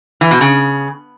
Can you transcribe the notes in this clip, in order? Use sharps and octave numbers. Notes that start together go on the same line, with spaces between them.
E3
B2
C#3